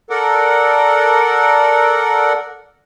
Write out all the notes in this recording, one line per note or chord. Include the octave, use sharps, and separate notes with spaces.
A4 A#4 D5 F#5